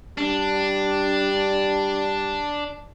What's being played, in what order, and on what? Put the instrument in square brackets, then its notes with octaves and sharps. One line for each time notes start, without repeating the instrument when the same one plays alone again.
[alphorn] G3 [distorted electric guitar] D4